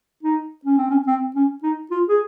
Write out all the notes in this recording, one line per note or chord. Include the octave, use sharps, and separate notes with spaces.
D#4
C#4
C4
C#4
C4
C#4
D#4
F4
G#4